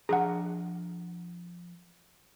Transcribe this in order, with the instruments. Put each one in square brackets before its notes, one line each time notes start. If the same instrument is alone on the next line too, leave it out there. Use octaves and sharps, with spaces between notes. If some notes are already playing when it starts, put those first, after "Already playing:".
[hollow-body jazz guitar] F3 D4 A#5 [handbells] G#4 F#5